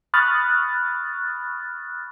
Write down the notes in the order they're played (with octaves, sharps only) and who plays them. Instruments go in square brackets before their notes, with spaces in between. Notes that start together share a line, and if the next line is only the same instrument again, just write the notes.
[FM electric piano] B5 C#6 D#6 F6 F#6 A6